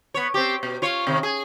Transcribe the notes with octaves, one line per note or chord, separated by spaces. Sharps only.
B3 C#5
C4 G4
B2
F4 C#5
C3 D#3
G#4